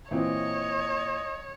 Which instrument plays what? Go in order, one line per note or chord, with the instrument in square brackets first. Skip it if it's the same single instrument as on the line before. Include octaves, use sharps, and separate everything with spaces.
[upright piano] A#2 E3 C4 [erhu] C#5 [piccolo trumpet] D#5